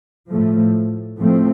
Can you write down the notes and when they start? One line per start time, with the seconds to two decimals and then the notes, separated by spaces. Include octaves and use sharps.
0.31 A2 F3 A3
1.18 A2 F3 A3 C4